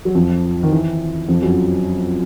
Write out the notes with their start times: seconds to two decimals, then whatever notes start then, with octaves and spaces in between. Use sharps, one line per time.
0.05 F#3
0.15 F2 F3
0.63 D#3
0.72 E3
1.28 F2 F3
1.42 F#2 F#3